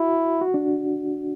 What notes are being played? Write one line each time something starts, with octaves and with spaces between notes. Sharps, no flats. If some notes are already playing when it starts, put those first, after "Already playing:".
Already playing: E4 F#4
F#4
D4